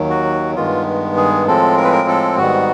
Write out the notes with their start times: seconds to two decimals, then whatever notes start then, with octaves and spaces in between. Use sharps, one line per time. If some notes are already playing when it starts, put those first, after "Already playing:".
Already playing: D#2 D#3 F#3
0.10 F#4
0.56 G2 D#3 G#3 B3 F4
1.17 G#4
1.47 A2 F3 G#3 C4 A4
1.77 A#4
1.84 B4
1.92 A#4
2.08 A4
2.38 G#2 D#3 G3 B3 F#4